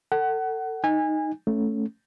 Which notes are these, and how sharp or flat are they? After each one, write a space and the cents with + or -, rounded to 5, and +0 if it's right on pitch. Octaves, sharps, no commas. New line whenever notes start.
A4 +30 F#5 +25
D#4 +0 G#5 -25
A3 +0 C#4 +0